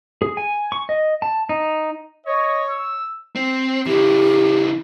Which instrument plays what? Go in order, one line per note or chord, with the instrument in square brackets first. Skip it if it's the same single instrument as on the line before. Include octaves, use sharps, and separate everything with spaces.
[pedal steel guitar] G#4
G#5
C#6
D#5
A5
D#4
[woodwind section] C#5 [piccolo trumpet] D#5
[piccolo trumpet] E6
[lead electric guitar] C4
[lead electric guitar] C#3 E3 [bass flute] G4